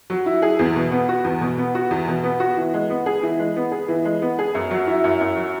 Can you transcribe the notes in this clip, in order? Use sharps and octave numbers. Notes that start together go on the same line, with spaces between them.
F#3
E4
G#4
E2
B2
B3
F#4
E2
B2
B3
F#4
E2
B2
B3
F#4
E3
G#3
B3
G#4
E3
G#3
B3
G#4
E3
G#3
B3
G#4
F#2
F#3
E4
F#2
F#2
F#3